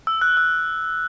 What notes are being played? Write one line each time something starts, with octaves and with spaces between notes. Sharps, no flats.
E6
F#6
E6